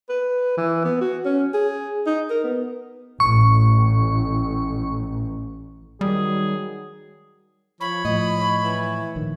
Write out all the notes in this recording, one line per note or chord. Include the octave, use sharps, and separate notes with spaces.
B4
E3
B3
F#4
C#4
G#4
D#4
A#4
B3
A1 C#6
D#3 F#3 G3 G#4
F3 C#5 B5
A2 F3 D#5
C#5
E3
A#1 D#3